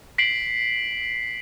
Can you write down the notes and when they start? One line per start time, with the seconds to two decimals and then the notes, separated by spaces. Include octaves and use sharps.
0.18 B6 C7 D7 F#7